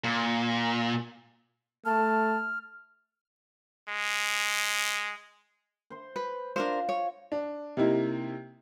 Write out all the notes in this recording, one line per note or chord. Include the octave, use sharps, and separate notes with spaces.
A#2
A3 A5 F6
G#3
C5 C6
B4
D4 F4 A#4 C5
C#5
D4
C3 A#3 D#4 E4